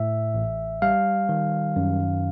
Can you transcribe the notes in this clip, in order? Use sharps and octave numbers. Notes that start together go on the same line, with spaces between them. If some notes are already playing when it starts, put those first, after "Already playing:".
Already playing: A2 E5
A1
G3 F5
D#3
F#2